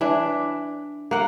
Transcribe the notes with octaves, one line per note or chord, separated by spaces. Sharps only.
E3 D4
A#3 F#5